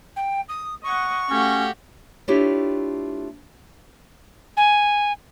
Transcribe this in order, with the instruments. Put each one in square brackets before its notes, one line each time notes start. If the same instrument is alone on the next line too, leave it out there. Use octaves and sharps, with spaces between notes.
[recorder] G5
D#6
[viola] D#5 F#5 [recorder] C#6
[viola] A3 F5 [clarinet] C#4 [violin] F#4 G4
[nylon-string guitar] A3 D4 E4 F4 G4 C#5
[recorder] G#5